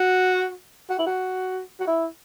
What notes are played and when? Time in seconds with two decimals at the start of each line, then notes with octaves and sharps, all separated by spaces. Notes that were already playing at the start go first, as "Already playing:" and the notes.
Already playing: F#4
0.90 F#4
0.99 E4
1.06 F#4
1.80 F#4
1.87 E4